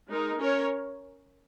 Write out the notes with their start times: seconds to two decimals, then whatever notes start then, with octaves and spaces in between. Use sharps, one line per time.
0.09 G#3 D#4 A#4
0.39 C#4 A#4 C#5